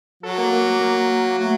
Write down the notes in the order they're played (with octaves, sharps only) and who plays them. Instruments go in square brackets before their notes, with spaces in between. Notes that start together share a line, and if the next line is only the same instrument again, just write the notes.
[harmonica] F#3 [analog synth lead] A4
[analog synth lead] A#3
A#3
A#3
A#3
[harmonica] F#3 [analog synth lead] A3